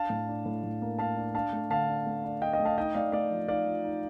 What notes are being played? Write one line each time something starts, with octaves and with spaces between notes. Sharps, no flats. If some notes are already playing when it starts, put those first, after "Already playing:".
Already playing: D4 F5 A5
A2
D4
A2
A2
A#3
A#3 F5 A5
D4
D4 F5 A5
A3
D3 F5 A5
D4
A3
D4
D4 D#5 G5
D#5 G5
A3
F5 A5
D#4 D#5 G5
A3 D5 F5
A3 D5 F5
F3
D#4 D5 F5
F3
D#4